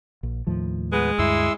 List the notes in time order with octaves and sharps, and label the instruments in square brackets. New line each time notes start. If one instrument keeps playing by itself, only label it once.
[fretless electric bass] A#1
D#2 A2 F3
[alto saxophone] G#3 [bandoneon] B3 B4
[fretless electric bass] D2 G2 [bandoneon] E4 C6 E6